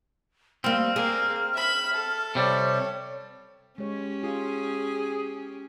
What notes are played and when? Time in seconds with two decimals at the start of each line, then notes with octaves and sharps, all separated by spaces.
0.64 G3 A#3 C4 F6
0.96 A#3 G#4
1.54 E5 B5
1.93 A4
2.35 C3 G3 C#5
3.78 G#3 C#4 G4 C#5
4.23 F4 G#4